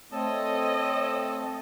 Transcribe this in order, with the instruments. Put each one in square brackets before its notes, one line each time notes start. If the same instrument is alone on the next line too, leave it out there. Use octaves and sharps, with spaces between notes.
[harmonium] A3 C4 [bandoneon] A4 A5 [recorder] C#5 [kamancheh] D#5